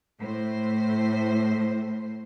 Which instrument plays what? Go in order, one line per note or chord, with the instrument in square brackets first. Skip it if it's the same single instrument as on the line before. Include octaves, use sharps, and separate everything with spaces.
[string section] A2 C5